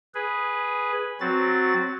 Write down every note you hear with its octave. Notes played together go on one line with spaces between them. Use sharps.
G#4 B4
F#3 C4 F#4 A6